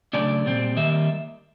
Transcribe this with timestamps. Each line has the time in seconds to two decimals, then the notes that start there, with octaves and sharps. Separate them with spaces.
0.13 C#3 F#3 A3 D4 D5
0.45 A#2 G3 C4
0.76 D#3 G3 A#3 E5